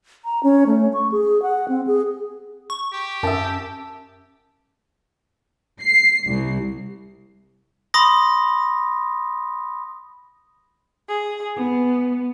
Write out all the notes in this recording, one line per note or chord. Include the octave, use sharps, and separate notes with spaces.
A#5
C#4
A3
C#6
G#4
F#5
C4
G#4
C#6
G4
F#2 E5 A5
C7
C2
B5 C6 D#6 A#6
G#4
B3